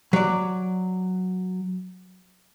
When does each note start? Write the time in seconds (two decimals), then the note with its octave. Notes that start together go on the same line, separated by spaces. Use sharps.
0.13 F#3 D5